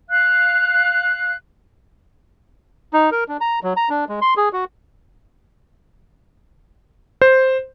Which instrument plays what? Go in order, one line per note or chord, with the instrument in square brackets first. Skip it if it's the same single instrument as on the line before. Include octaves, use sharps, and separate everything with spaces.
[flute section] F5 F#6
[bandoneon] D#4
A#4
D4
A#5
F#3
A#5
D4
G#3
C6
G#4
F#4
[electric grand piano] C5